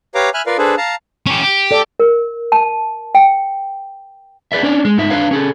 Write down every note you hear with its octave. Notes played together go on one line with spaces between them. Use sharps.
G4 B4 C#5 F5 A#5 D6
E5 G#5 B5 F6 F#6
F4 A#4 B4 D5 F5
D4 G#4 A4 B4 C5
F5 A5 A#5
C#4 G4
G4
A4 D5
A#4
A5
G5
G#4 B4 D5 E5
C#4 D4 C#5 D5
G#3
G#2 D#4 E5
D4 B4 C#5 F5
C#4 G#4 A4